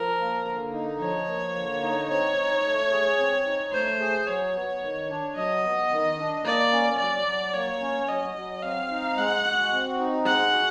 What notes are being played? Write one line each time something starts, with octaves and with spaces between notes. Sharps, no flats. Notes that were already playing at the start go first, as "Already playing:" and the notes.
Already playing: F3 A#4
A#3
D3
D#4
F3 C#5
A#3
D3
D#4
C4 C#5
D#4
A3
G#4
C4
D#4
A3 C5
G#4
F#3 C#5
B3
D#3
D4
F#3 D#5
B3
D#3
D4
A#3 D5
C#4
F#3 D5
F#3
A#3 C#5
C#4
F#3 D#5
F#3
C4 F5
D#4
G#3 F#5
F#4
C4
D#4
G#3 F#5
F#4